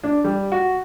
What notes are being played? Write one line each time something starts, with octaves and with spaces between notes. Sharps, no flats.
D4
G3
F#4